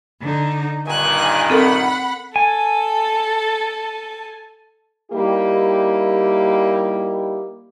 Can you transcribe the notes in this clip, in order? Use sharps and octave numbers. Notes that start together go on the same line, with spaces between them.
D3 D#4
G2 A#2 D#3 G#5 F#6
C4 A4 A#4 F#5 B5
A4 G#5 A5
G3 A#3 D#4 E4 G4